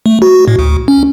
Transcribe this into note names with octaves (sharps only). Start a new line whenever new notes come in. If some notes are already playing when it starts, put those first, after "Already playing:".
A3
F#4
A2
D2
C#4